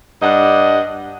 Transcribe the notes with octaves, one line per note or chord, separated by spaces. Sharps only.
G2 D4 D#5 F#5